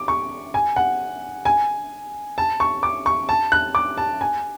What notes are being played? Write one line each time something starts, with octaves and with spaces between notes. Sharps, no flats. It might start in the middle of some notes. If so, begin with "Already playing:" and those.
Already playing: D6
C#6
G#5
F#5
G#5
A5
C#6
D6
C#6
A5
F#6
D6
A5
G#5